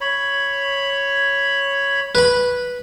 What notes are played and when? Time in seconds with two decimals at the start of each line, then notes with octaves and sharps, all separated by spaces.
0.01 C#5 B5
2.15 B4 B5